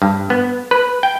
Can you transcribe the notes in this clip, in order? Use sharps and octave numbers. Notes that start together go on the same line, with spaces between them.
G2
B3
B4
G5